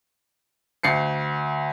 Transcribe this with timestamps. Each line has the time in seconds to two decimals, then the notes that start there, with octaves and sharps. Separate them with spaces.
0.83 D2 C7 C#7